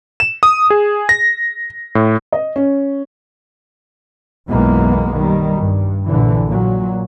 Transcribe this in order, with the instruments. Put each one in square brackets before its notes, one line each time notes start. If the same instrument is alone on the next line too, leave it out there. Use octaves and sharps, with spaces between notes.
[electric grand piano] E7
D#6
G#4
A#6
A2
[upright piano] D#5
C#4
[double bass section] B1 F#2 E3 G#3 A#3 B3
D#3 G3
G2
A#1 A#2 D3 E3
A#2 F#3